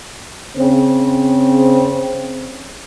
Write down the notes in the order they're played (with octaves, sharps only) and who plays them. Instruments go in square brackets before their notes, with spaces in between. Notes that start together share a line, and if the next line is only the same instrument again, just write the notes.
[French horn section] C#3 C4